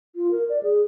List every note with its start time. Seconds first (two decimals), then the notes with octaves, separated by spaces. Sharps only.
0.16 F4
0.31 A#4
0.49 D5
0.63 G#4